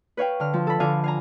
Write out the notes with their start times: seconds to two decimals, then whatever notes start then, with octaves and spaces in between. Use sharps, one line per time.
0.17 B4 C#5 F5 G5
0.40 D3 F6
0.53 F3
0.67 A4 B5
0.80 D3 F4 F5 G#5 D6
1.04 F5 G#5 A#5